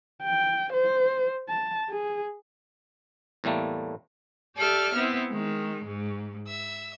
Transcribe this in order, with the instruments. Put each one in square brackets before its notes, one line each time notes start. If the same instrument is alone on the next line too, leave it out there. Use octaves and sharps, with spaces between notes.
[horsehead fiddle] G5
C5
A5
G#4
[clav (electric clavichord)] E2 A2 G3 A3 A#3
[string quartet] G4 A4 D5 E5 F6
B3 C4 E4
D#3 G#3
G#2
E5 E6